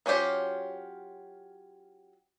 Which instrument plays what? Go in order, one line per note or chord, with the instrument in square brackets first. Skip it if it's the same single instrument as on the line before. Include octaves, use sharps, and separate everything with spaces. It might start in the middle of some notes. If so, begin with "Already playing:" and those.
[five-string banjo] F#3 C#4 F4 G4 C5